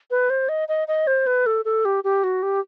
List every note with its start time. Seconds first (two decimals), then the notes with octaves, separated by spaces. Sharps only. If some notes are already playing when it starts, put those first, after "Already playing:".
0.11 B4
0.30 C5
0.49 D#5
0.68 D#5
0.88 D#5
1.07 C5
1.27 B4
1.46 A4
1.65 A4
1.85 G4
2.04 G4
2.24 F#4
2.43 G4